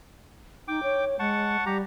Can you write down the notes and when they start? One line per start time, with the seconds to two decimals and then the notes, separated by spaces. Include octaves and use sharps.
0.68 D#4 G5 D6
0.83 C#5
1.19 G#3 F#5 A5 C#6
1.66 G3 G4 A#5